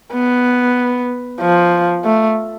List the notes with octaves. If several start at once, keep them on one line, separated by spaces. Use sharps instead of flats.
B3
F3
A3